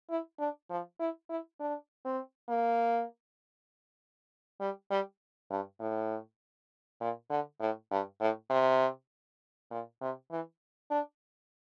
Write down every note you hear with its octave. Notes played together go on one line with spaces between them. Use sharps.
E4
D4
F3
E4
E4
D4
C4
A#3
G3
G3
G2
A2
A#2
D3
A2
G2
A2
C3
A#2
C3
E3
D4